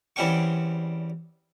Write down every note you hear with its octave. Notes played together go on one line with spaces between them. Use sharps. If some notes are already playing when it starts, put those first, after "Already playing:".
E2 G3 C4 C#4 G5 C#6